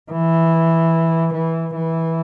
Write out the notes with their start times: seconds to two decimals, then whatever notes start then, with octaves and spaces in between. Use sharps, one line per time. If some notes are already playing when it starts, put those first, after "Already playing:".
0.12 E3
1.34 E3
1.76 E3